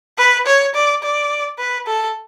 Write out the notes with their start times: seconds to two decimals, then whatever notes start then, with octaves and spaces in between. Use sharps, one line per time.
0.18 B4
0.46 C#5
0.75 D5
1.03 D5
1.58 B4
1.87 A4